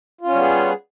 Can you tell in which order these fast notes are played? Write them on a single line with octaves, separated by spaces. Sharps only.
F4 C#4 G3 B3 G#4